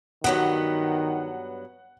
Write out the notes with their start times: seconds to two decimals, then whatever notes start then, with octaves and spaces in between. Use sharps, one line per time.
0.24 G2 D#3 F#3 B3 F#5